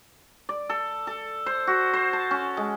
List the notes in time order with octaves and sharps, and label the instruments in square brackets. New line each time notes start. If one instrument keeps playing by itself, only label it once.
[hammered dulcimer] D5
A4
A4
C5
F#4
C5
A5
C#4
G#3